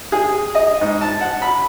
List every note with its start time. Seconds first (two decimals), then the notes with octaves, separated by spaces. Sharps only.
0.12 G#4
0.55 D#5
0.81 G#2
1.01 A5
1.21 F#5
1.42 B5